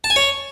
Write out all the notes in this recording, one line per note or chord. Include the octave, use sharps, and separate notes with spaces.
A5
G#5
C#5